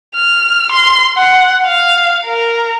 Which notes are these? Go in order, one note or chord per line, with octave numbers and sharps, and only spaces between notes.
F6
C6
F#5
F5
A#4